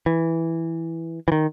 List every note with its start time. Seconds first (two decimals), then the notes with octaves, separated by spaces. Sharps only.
0.06 E3
1.28 E3
1.32 D#3